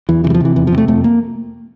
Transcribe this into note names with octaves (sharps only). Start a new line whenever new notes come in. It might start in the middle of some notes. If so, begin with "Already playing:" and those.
E2 E3
C3 E3
G3
F3
C3 E3
E2 E3
F3
C3
A3
F2 A3
A#3